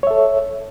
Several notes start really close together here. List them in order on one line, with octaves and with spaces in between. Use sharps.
C#5 E5 A4